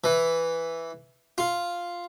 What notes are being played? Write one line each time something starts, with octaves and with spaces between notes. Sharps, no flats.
E3
F4